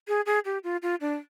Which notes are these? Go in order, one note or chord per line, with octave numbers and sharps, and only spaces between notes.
G#4
G#4
G4
F4
F4
D4